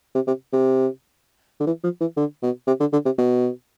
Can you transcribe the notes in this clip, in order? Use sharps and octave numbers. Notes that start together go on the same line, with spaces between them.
C3
C3
C3
D3
E3
F3
E3
D3
B2
C3
D3
D3
C3
B2